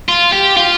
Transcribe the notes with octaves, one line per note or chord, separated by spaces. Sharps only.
F4
G4
F4